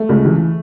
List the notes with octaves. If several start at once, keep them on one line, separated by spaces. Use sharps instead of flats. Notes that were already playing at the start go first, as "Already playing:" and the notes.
Already playing: A3
C#2
E3